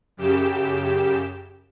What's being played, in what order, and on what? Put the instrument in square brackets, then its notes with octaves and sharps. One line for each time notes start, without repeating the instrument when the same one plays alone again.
[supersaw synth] F#2 C#3 G4 E7